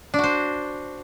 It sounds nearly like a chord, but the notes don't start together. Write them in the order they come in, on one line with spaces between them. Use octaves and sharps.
D4 F#4 C5